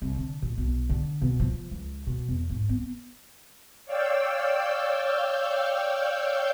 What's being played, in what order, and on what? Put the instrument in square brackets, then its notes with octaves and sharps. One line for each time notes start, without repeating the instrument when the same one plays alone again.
[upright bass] C2
D3
A#2
B1
D3
B2
F3
C#2
B2
E2
G#2
B3
[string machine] C#5 D5 F5 G5 E6 G6